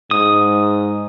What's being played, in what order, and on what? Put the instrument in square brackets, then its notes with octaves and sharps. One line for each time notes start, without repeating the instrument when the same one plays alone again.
[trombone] G#2 [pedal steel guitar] D#6